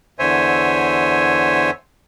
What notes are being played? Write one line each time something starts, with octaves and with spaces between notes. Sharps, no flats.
E2 D3 C5 C#5 E5 G#5